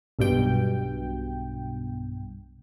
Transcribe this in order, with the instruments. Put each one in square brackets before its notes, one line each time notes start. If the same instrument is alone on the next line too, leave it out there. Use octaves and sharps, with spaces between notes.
[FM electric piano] B1 G2 B2 G5